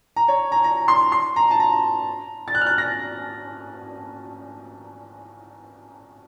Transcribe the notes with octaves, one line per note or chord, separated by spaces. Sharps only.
A#5
C#5
A#5
A#5
C6
C6
A#5
A5
A#5
A6
F#6
F6
F#6
A#6